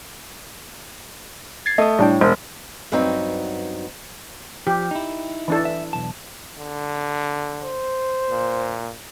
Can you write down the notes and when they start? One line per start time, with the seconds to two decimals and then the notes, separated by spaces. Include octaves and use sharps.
1.66 G#6 A6 C7
1.78 A3 D#5 D#6
1.99 A2 G3 D4 G5
2.21 E1 C5
2.92 G2 F#3 B3 C4 D#4
4.67 F3 G4
4.91 D#4 E4
5.48 E3 D4 A4
5.65 E5
5.93 B1 E2 A5
6.59 D3
7.62 C5
8.30 A#2